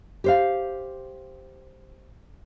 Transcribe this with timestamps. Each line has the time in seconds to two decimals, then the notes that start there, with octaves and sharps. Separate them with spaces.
0.24 G4 C5 F5